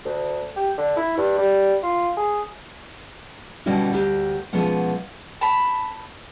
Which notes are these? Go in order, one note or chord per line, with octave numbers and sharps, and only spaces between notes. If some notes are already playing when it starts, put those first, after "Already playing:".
D2
G4
D3
E4
G2
G3
F4
G#4
B2 D3 G3 C#4 E4 F#4
D2 G4
B2 F3 G#3 B3 C#4 F#5
A5 B5